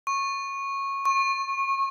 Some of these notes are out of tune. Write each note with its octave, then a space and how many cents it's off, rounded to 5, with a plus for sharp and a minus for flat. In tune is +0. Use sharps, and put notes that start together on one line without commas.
C#6 -15
C#6 -30